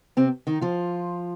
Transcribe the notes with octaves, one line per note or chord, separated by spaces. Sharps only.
C3 C4
D#3 D#4
F3 F4